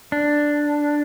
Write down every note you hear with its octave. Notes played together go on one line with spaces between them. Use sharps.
D4